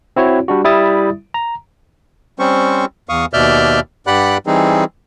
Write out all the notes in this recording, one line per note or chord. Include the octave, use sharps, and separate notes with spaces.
C4 E4 F#4 C#5
G3 D4 F#4
G3 E4 E5 D#6 A6
A#5
G3 C4 C#4 C5 C#6
E2 F5 C#6 D#6
D#2 B2 D5 E5 F6 G6
G2 G4 D5 F#5 B5 F#6
E3 G3 C4 D#4 G#4